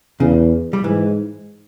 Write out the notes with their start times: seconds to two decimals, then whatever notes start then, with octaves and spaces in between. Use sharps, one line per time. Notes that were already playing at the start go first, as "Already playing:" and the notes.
0.20 E2 C#3
0.73 G3
0.84 G#2 E3